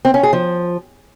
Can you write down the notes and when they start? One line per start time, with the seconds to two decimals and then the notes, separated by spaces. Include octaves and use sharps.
0.05 C4
0.14 C#4
0.23 G#4
0.33 F3